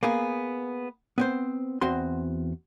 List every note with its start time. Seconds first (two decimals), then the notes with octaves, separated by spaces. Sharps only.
0.03 A#3 B3 G#4
1.18 B3 C4 C5
1.81 E2 C4 F#4 C6